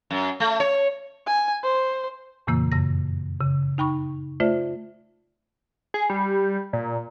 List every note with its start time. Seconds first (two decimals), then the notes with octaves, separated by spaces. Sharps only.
0.10 F#2
0.40 A3
0.60 C#5
1.27 G#5
1.63 C5
2.47 F2 A#2 C#3 E3 A#3 E6
2.72 F#2 C#3 A#6
3.40 C#3
3.78 D#4 G5 B5 C#6
4.40 A3 F4 C5 D5 E5
5.94 G#4
6.10 G3
6.73 A#2